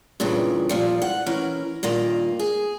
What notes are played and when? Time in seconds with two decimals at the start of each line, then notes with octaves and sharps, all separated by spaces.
0.20 G2 A#2 C#3 E3
0.69 A#2 F3 G3
1.02 F#5
1.26 E3 C#4 A#4
1.83 G2 A#2 D#3 A#3
2.39 G#4